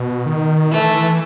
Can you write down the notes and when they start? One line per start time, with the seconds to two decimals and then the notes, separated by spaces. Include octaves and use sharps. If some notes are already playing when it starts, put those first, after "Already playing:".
Already playing: B2
0.26 D#3
0.72 E3 A3